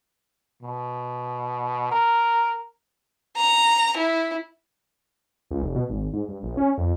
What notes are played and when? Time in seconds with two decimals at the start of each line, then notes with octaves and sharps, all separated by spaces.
0.63 B2
1.92 A#4
3.37 A#5
3.97 E4
5.51 C#2
5.62 F1
5.76 B2
5.90 G#1
6.13 G#2
6.28 G2
6.43 A#1
6.57 C#4
6.78 F2